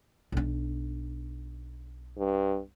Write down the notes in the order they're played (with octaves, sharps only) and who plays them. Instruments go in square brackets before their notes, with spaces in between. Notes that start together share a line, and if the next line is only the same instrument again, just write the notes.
[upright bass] B1 D4
[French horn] G2